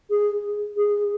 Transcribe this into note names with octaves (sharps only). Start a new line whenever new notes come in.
G#4
G#4